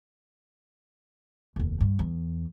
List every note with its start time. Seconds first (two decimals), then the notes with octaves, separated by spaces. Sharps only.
1.56 F1 D#2
1.81 G2
1.99 E2